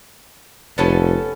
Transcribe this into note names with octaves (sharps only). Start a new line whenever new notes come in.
F1 B3 C#4 A4